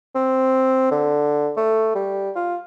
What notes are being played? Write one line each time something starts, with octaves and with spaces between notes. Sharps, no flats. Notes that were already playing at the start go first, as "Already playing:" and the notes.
C4
D3
A3
G3
F4